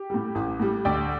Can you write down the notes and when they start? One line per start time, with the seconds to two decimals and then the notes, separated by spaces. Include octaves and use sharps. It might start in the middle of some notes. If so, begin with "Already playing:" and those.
Already playing: G4
0.10 A2 G3
0.35 A1
0.60 A2 G3
0.85 D2 D5 G5